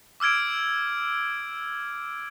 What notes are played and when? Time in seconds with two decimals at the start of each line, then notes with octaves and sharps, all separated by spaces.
0.20 D6 E6 F6 G#6 D7